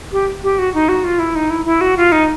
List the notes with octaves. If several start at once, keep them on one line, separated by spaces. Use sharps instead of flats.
G4
G4
F#4
D#4
F#4
F4
E4
D#4
E4
E4
F#4
F4
D#4